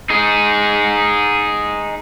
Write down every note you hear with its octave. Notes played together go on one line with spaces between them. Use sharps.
D#4 G#4